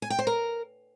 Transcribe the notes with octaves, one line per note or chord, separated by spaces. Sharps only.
G#5
G5
C5
A#4